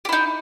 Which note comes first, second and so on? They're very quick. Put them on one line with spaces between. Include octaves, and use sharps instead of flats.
G4 E4 D#4